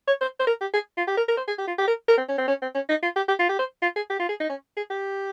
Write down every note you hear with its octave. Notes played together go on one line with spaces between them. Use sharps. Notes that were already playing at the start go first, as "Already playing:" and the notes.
C#5
C5
C5
A#4
G4
G#4
F4
G4
A#4
A#4
C5
G#4
G4
F4
G4
A#4
A#4
C4
C#4
C4
C#4
C4
C#4
D#4
F4
G4
G4
F4
G4
C5
F4
G#4
G4
F4
G#4
D#4
C#4
G#4
G4